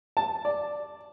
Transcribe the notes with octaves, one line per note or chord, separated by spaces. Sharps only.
A5
D5